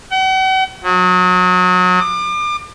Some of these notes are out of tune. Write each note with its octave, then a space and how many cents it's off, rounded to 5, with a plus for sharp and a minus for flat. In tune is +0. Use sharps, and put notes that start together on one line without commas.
F#5 +45
F#3 -30
D6 +35